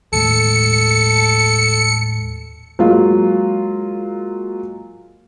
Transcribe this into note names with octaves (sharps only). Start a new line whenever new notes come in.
D#2 A2 G#3 A4 C#7
F#3 G#3 A#3 F4